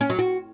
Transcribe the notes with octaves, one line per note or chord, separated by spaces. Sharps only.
C#4
F#3
F#4